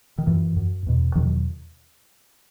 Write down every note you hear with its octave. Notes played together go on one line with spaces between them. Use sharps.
D#3
F#2 E3
F#2
E2 B2
E2 B2 D#3 F#3